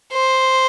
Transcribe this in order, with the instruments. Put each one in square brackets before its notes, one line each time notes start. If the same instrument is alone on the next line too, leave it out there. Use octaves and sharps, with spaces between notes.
[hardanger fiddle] C5